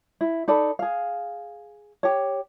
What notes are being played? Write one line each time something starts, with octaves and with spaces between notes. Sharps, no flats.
E4
D#4 A4 D5 B5
G#4 F5
G4 C#5